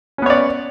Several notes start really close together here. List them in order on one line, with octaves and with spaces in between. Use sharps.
C#4 B3 C#5 D5